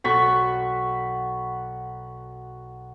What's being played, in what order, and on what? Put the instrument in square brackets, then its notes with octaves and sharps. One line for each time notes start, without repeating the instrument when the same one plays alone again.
[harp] B1 C4 A4 [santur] F#4 B5 C#6